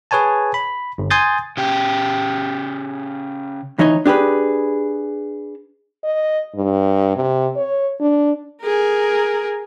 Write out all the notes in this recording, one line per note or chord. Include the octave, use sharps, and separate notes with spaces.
G#4 B4 C#5 G#5 A5
B5
G1
G#5 C6 D#6 G6 A6
C#3 G4
D2 E3 D#4 C#5 D#5
D4 G4 G#4 B4
D#5
G2
C3
C#5
D4
G#4 A#4